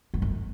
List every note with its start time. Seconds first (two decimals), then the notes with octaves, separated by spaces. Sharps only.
0.14 G2
0.22 F#2